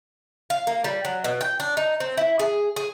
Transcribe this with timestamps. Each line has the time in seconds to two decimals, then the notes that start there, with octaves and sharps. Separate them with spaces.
0.50 F5
0.67 A#3
0.84 G3
1.05 F#3
1.24 B2
1.41 G5
1.60 D4
1.77 D#4
2.00 C4
2.17 E4
2.39 G#4
2.76 G#4